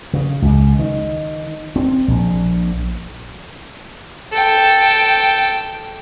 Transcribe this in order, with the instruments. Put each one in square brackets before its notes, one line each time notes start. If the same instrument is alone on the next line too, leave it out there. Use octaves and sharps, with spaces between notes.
[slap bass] C#3
C#2
D#3
C4
A#1
[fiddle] A4 G5